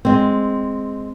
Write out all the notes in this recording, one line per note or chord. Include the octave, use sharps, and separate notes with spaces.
G#3 C4